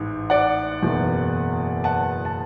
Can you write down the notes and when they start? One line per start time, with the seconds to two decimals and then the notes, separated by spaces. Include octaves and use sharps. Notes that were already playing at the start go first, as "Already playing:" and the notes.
Already playing: A1 G#2
0.30 D5 F#5
0.82 F#1 E2 B2
1.84 F#5 A5
2.25 A5